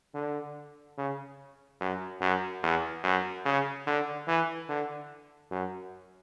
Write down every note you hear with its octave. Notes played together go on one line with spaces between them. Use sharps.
D3
C#3
F#2
F#2
E2
F#2
C#3
D3
E3
D3
F#2